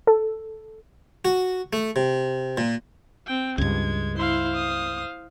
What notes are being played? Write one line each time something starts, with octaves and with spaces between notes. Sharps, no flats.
A4
F#4
A3
C3
A#2
C4 G5
C#2 G2 G#3 G#6
E4 C5 F5 C6
D#6